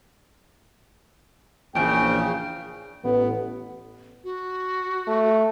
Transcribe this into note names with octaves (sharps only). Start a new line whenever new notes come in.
A#1 E2 C#3 G5
A1 B3
F#4
A3